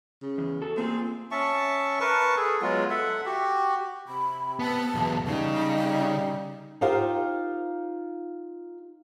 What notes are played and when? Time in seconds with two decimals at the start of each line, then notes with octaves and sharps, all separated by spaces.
0.22 C#3
0.38 E2
0.62 F#4 A4
0.77 A#3 C4 F4 G#4
1.31 C#4 E5 A5 C#6
2.00 A#4 B4 A5 C#6
2.36 G#4 A4
2.62 F#3 G#3 B3 F4
2.90 A4 E5 F#5
3.26 F#4 G4
4.08 C3 B5
4.59 B3 A5
4.95 B1 E2 B3
5.27 C#3 G3 D#4
6.81 D#4 F4 G4 A#4 C5 F5